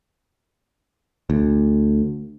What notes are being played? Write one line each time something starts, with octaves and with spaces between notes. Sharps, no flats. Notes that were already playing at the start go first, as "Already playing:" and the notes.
D2